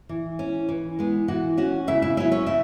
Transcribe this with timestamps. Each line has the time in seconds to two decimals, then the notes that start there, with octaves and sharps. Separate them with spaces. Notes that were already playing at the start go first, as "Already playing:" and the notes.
0.09 E3
0.39 C#4
0.69 E3
0.99 G#3 B3
1.28 E3 F#4 F#5
1.57 C#4 F#4 F#5
1.87 C#3 E4 E5
2.02 E4 E5
2.17 F#3 C#4 E4 E5
2.32 C#4 C#5
2.46 C#3 E4 E5